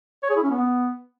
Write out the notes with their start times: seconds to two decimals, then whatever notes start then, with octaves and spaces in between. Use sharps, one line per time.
0.23 C#5
0.30 G#4
0.37 E4
0.44 C#4
0.50 B3